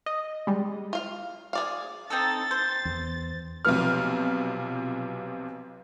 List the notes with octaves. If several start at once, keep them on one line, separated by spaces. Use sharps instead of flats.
D#5
G3 G#3
F4 F5
G#4 D5 F5
C4 D#4 A4 A6
C5
E2
B1 C3 F3 B3 F6